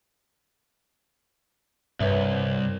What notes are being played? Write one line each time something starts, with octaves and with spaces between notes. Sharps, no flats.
C2 G2 B4 C#5 E5